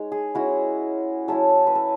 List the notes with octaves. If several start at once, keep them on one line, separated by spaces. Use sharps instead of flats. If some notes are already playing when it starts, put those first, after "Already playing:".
Already playing: G#3 D#4 C#5
G#4
G#3 C#4 E4 F#4
F#3 C#4 E4 A4
B4
A4